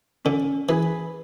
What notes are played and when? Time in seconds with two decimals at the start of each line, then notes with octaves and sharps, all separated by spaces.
0.25 D3 C#4
0.69 E3 G#4 B4